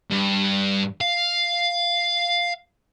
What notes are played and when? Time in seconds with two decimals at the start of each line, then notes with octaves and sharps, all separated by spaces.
0.10 G2
1.01 F5